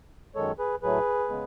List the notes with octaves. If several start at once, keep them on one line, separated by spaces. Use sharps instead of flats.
F#2 D#3 G#3 A4 C#5
G#4 B4
A2 F#3 A3 G#4 B4
C#3 G#3 B3